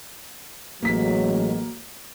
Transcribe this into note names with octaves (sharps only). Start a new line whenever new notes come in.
A1 F#3 G#3 A#3 B6